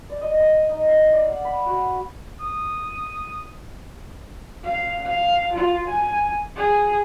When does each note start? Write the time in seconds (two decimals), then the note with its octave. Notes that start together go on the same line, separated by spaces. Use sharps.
0.09 D5
0.21 D#5
0.40 D#6
0.69 D#4
0.89 F5
1.13 D5
1.28 F#5
1.45 B5
1.66 F#4
2.40 D#6
4.65 F5
5.06 F5
5.53 F4
5.87 G#5
6.56 G#4